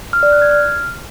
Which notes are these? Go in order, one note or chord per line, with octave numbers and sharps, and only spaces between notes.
F6
D5
F#6
G#6
F6